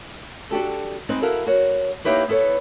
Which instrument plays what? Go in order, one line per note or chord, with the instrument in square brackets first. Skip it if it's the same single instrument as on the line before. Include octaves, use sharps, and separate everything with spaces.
[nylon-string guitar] D4 F#4 G4 A4
G#3 B3 C4 D#4 B4
E4 F#4 A4 A#4 F5
F#4 A#4 C#5
A#3 D#4 E4 G4 B4 C#5
B3 E4 A4 B4 C#5